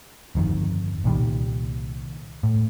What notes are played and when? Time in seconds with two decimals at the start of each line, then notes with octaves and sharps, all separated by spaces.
0.35 G1 F2 D#3
1.04 C2 A#2 D#3 G3
2.43 A2